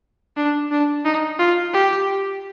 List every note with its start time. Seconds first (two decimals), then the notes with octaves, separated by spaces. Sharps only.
0.37 D4
0.71 D4
1.05 D#4
1.39 F4
1.73 G4